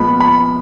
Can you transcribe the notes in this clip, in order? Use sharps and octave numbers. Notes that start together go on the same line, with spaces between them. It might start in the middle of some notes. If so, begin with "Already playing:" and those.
Already playing: A#2 F3 G#3 B3 B5
B5